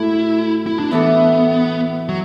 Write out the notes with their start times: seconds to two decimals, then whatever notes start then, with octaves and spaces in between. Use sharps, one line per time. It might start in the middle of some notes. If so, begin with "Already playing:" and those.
Already playing: A2 A3 E4 F#4 A4
0.67 E4
0.79 D4
0.91 E3 B3 D4 A4
2.09 F#3